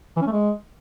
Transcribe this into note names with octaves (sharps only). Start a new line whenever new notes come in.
E3
C#4
A3
G#3